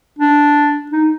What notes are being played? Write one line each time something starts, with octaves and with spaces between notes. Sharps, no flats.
D4
D#4